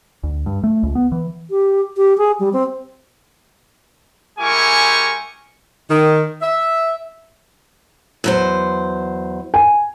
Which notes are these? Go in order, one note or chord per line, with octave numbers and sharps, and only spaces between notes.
D2
G2
A3
C#2
B3
E3
G4
G4
G#4
G3
C4
G#3 E4 G4 A#4 G#5 C#6
D#3
E5
E2 F#3 C5
G#5